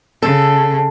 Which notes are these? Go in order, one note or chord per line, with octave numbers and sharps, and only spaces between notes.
C#3 A4